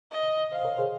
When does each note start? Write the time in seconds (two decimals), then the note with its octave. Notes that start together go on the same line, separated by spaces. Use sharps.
0.12 D#5
0.52 C5 D#5 F5
0.65 A#4 C#5
0.78 G#4 C5